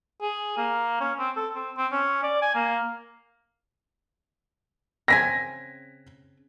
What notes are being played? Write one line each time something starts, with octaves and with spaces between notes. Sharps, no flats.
G#4
A#3
C#4
C4
A4
C4
C4
C#4
D5
G#5
A#3
C#3 C4 G#5 A#6 B6